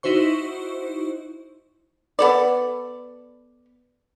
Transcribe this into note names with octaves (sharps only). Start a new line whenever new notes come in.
D#4 E4 F#4 C5 C#6
B3 A4 D5